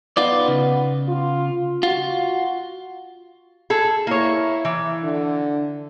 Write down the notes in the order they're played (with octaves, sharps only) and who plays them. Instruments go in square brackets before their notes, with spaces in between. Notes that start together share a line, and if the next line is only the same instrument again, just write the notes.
[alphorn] B3 [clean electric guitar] D#4 F4 D5
[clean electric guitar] C#3
[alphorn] F4
[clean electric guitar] F4 [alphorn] F#4
[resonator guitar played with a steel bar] G#4 A4
[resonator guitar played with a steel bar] A#3 C#5 [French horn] E4
[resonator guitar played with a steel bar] E3
[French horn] D3